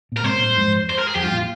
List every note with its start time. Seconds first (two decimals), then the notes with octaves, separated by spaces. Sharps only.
0.12 A#2 A#4
0.23 G#2 C3 C5
0.40 G2 A#2
0.56 F2 G#2
0.90 C5
0.98 A#4
1.07 G#4
1.15 F2 G4
1.23 G2 F4
1.32 A#2